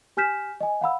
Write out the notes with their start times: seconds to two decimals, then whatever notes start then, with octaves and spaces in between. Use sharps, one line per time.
0.17 G4 G#5 F6 G6 B6 E7
0.61 D#5 G#5
0.81 F5 F#5 B5 E6